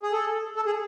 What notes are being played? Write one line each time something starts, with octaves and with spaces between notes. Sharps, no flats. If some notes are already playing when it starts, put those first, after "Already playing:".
G#4
A4
A4
G#4